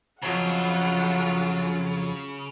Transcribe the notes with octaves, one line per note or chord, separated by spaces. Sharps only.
F2 C#3 F#3 F4 F#5